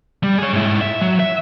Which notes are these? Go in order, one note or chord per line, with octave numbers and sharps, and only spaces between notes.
G3
G#4 C#5
G#2 E4
E5
F#3
E5